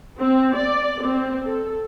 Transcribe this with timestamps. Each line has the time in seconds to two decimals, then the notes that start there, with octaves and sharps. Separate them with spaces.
0.20 C4
0.57 D5
1.04 C4
1.46 A4